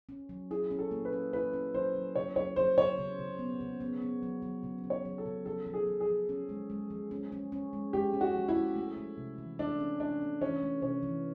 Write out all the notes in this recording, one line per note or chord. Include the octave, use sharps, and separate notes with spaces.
C#4
F#3
E4 G#4
C#4
A4
A#3
B4
C#4
E4 B4
C#4
F#3 C5
F#3
C#3 C#5
F#3 C#5
F#3 C5
C#3 C#5
C#3
C#3
B3
C#3
B3
B3
F#3
F#3
C#3
F#3
C#5
F#3
A4
C#3
F3 A4
F3
G#4
F3
G#4
F3
C#4
G#3
G#3
F3
C#4
C#4
C#4
G#3
G#3 G4
C#4
F#4
F3
E4
G#3
A3
A3
C3
E3
A3 D4
C#4
A3 D4
C#4
E3 C#4
A3
C3 C#4
E3